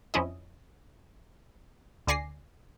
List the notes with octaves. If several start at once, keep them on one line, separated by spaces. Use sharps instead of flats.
F2 F3 C#4 E4 D#5
D2 D3 D5 G#5 A#6 C7